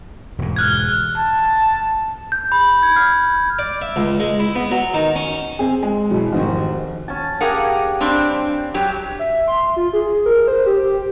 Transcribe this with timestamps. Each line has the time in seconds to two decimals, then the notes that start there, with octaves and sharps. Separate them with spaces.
0.38 E1 G#2
0.56 F6 F#6 G#6
1.17 A5
2.32 G6
2.52 B5
2.83 G#6
2.96 F6
3.59 D5
3.81 E5
3.96 C#2
4.20 G#3
4.40 E4
4.55 B3
4.71 F#3
4.94 D#3
5.16 C#4
5.59 C4 G#4
5.83 G#3
6.10 F#2 B2 E3
6.32 F1 G#2 D#3
7.08 C#4 A5
7.41 G4 G#4 A#4 F5 F#5
8.01 G3 C4 D4
8.74 F#3 G4
9.19 E5
9.48 C6
9.76 F4
9.93 G#4
10.26 A#4
10.48 C5
10.66 G4